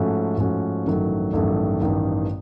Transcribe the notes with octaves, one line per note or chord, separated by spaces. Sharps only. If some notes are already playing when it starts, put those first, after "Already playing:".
Already playing: G#2 F3 A3 C#4 F#4
G#2 F3 A3 C#4 F#4
A1 G2 D#3 F#3 A3
A1 G2 D#3 F#3 A3
A1 G2 D#3